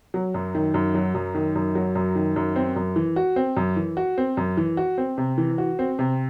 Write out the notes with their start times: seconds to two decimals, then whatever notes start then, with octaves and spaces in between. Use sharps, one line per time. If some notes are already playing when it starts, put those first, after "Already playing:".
0.14 F#3
0.34 F#2
0.55 D#3
0.74 F#2
0.95 F#3
1.15 F#2
1.35 D#3
1.55 F#2
1.75 F#3
1.95 F#2
2.15 D#3
2.36 F#2
2.56 C4
2.76 F#2
2.96 E3
3.16 F#4
3.36 C4
3.57 F#2
3.76 E3
3.97 F#4
4.18 C4
4.37 F#2
4.57 E3
4.77 F#4
4.98 C4
5.18 C3
5.38 E3
5.58 F#4
5.79 C4
5.99 C3